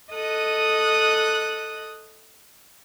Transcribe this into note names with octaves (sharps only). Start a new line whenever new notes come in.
A4 D#5 D#6 F#6